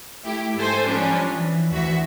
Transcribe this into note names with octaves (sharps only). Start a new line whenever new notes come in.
A3 E4 G4
G#2 A4 C5 G#5
F3 G3 C#4 D4
E3
D2 E3 F#4 E5